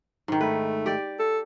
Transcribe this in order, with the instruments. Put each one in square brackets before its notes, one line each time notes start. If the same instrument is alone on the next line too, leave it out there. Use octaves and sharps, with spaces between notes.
[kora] G#2 D#3
[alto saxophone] A3 [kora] B4
[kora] G4 D5
[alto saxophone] A4